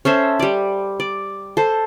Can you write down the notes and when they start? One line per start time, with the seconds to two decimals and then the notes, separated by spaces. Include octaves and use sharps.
0.05 C#4 A4 C5 E5
0.39 G3 D5
1.00 D5
1.57 A4 C5